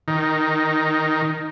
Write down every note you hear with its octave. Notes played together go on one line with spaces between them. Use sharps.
D#3